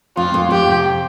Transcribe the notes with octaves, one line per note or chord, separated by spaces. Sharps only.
F2 F4
F2
F2 G4
C3